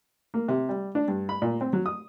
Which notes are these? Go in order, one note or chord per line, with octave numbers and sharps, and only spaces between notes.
A#3
C3
G3
D4
G2
B5
A#2
C4
F#3
D#6